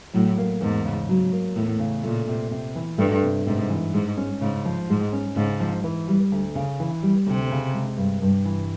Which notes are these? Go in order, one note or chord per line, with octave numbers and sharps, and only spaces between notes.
A2 F#3
A#3
E2 G#2
C#3
F#3
A#3
E2 A2
C#3
A#2 A3
C3
C3
E3
G2 A3
C3
G#2 C3
E3
G#2 G#3
C#4
G#2 C#3
F3
G#2 G#3
C#4
G#2 C#3
F3
E3
G3
D2
C#3
E3
G3
D2 C3
C#3
G#3
G2
G2
E3